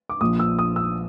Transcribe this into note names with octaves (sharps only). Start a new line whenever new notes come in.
D6
A#1 A#2 F3 D#6
E6
D#6
E6